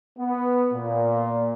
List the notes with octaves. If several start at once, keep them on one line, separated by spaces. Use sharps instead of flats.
B3
A#2